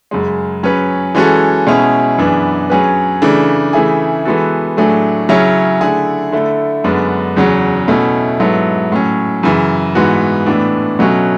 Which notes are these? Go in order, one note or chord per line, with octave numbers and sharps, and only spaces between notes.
F#2 C#3 G#3
F#3 C#4 G#4 B4
E3 G#3 C#4 F#4 A4
B2 G#3 C#4 E4 G#4
F#2 E3 B3 D4 G#4
F#3 C#4 G#4 B4
C#3 E3 A3 D4
C#3 E3 A3 E4 G#4
E3 G#3 B3 F#4 A4
A2 F#3 A3 D4 G#4
C#3 F#3 C#4 E4
D3 A3 E4 G#4
D3 A3 E4
F#2 D3 G#3 B3 D4
E2 C#3 F#3
B2 A3 C#4 E4
G#2 F#3 B3 E4 A4
A2 F#3 C#4
F#2 C#3 E3
G#2 E3 B3 F#4
A2 E3 B3 D4
B2 F#3 A3 C#4 F#4